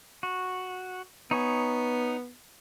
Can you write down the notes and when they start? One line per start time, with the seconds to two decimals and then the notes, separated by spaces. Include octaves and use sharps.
0.23 F#4
1.31 B3 D#4 C#5 G#5